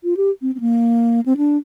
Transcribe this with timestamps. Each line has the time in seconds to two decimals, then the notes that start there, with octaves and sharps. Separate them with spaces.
0.04 F4
0.17 G4
0.42 C4
0.55 C4
0.60 A#3
1.26 C4
1.37 D4